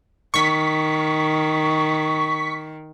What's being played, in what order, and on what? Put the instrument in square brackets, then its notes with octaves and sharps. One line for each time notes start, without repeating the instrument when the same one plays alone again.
[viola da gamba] D#3 [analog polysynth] C#6 B6